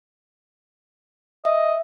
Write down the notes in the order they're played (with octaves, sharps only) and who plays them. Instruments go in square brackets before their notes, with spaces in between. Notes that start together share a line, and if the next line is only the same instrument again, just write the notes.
[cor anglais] D#5 [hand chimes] E5